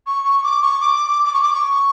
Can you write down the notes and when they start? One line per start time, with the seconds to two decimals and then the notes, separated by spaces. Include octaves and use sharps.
0.06 C#6
0.24 C#6
0.43 D6
0.61 C#6
0.80 D6
1.24 D6
1.33 C#6
1.42 D6
1.53 C#6